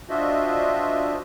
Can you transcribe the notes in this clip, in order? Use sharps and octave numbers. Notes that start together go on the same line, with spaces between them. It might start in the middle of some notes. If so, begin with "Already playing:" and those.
D4 F4 F#4 C5 D#5 E5